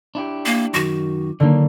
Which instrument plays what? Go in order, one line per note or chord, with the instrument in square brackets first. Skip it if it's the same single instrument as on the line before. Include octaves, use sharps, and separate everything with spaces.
[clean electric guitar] D4 E4 G4
[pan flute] A#3
[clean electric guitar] F#2 D#3 [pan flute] F#4 [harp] D6
[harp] D3 A#3 [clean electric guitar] D#3 F#3